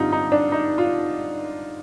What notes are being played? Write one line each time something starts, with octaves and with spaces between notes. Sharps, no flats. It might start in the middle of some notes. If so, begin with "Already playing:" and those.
Already playing: G2 D3 G3 C4 D#4 F4
D#4
D4
D#4
F4